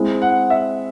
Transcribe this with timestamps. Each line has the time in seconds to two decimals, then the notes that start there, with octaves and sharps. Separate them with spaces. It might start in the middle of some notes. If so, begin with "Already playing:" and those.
Already playing: G#3 C4 E4
0.22 F#5
0.50 E5